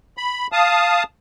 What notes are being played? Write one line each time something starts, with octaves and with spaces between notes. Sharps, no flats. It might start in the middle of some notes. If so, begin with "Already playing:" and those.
B5
F5 A5 D#6